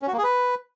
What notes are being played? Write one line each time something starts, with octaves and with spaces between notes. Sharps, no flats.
C#4
F#4
A#3
G#4
B4